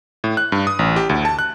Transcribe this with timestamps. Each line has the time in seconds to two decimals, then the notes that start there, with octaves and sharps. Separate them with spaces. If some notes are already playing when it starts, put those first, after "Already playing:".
0.24 A2
0.37 F#6
0.52 G2
0.67 D#6
0.79 A1
0.96 G4
1.09 D2
1.25 A5
1.39 F#6